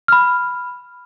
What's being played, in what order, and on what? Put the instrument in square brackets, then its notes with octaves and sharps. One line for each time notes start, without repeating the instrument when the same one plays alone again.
[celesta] B5 F6